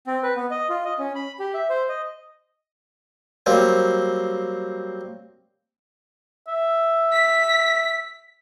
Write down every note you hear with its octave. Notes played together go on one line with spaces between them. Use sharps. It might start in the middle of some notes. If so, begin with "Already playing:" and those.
C4
B4
B3
D#5
F4
D#5
C#4
B5
G4
E5
C5
D#5
F#3 G3 A#3 C4
E5
B6